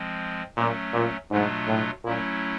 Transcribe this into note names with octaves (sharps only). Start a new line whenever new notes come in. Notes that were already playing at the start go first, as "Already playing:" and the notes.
Already playing: F3 G#3 C4
A#2 F#3 A3 C#4
A#2
G#2 B2 F#3 A3 D4 F4
A2
A#2 F#3 A3 C#4 E4